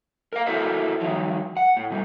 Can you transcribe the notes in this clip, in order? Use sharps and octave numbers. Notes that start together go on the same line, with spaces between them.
A#4 F5
E4 F#4 A4 A#4 C5 E5
G2 D#3 F3 F#3
F#5
A2
B2 G3